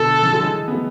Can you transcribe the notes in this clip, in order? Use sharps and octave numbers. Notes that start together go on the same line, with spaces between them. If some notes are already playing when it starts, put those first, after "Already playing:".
Already playing: B2 D3 A4
C#3 E3
D3 F#3
E3 G#3
B3
F#3 A3